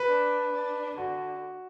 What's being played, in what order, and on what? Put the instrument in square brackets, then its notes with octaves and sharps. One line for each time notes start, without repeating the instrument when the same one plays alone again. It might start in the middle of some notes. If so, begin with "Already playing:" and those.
Already playing: [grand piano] B4
[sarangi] D4
D4
[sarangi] D3 [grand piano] F#4